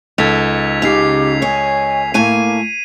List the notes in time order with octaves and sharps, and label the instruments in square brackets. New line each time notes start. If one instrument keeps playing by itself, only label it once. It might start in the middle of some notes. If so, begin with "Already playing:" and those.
[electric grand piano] C#2 A4 [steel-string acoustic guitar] D#4 [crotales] G#6 B6 F7
[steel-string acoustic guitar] C#3 D#4 [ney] G4 [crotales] C7 F7
[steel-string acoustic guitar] C#5 D#5 [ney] G#5
[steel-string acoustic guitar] A2 A3 G#5 [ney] A#3 [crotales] D#7